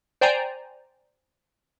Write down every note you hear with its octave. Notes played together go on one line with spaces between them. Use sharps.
C5 D5 G5 G#5 A#5